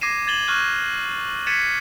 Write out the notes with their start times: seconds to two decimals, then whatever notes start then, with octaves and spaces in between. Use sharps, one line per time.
0.01 D6 G#6 A#6 C7 D#7 E7
0.27 G#6 A6 E7 F#7 G7
0.47 C#6 F6 F#6 G#6 D#7
1.25 F#7
1.47 G#6 A6 B6 C#7 D#7 E7